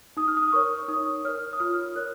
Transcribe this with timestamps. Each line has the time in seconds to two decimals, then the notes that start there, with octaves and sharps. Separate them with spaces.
0.17 D#4 D#6
0.28 F6
0.37 D#6
0.48 D#6
0.52 A#4 C#5 C#6
0.88 D#4 D#6
1.25 A#4 C#5 F6
1.53 D#6
1.60 F4 F6
1.96 A#4 C#5 F#6